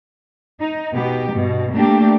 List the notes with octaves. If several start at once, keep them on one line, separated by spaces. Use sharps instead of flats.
D#4
B2 B3 G4
G2 B2
A3 A#3 D4 G4